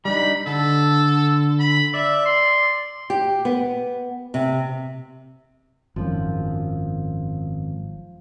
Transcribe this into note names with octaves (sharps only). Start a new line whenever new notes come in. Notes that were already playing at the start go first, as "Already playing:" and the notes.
G3 D4 D#4 B5
D3 A4
B5
D5 E5
C6
G4
B3
C3
G#1 F#2 F3